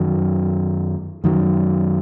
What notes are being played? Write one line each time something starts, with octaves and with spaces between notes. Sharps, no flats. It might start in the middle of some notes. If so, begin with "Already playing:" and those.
Already playing: F#2 D#3 F#3
F#2 D#3 F#3